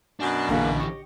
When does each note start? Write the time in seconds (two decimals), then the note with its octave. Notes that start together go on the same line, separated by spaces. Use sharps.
0.20 F#2 B2 D4
0.49 A#1 F2 D3 E3 A#3 C#4 G#4
0.80 G4 D#5 C#6